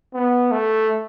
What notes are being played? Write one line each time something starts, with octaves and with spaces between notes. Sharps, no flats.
B3
A3